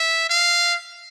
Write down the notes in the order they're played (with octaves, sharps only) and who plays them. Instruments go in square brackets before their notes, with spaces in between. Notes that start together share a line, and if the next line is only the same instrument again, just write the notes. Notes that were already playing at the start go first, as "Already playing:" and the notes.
Already playing: [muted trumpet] E5
F5